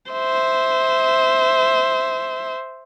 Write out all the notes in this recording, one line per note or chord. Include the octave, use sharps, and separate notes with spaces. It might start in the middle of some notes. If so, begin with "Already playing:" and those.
C5 E5